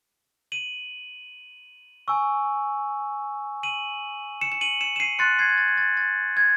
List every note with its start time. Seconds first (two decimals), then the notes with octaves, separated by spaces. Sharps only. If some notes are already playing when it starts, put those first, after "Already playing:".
0.52 D#7 F#7
2.08 G#5 C#6 E6
3.63 D#7 F#7
4.41 C#7 E7
4.52 E7
4.61 D#7 F#7
4.81 C#7 E7
4.96 E7
5.00 C7 D#7
5.19 C6 F#6 A6 C#7
5.39 G#6 C7
5.50 G#6
5.58 A6
5.68 G#6
5.78 A6
5.97 A6
6.37 G#6